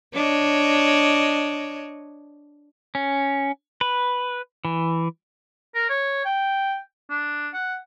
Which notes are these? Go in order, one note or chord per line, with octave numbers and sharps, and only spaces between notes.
D4 C#5 D#5
C#4
B4
E3
A#4
C#5
G5
D4
F#5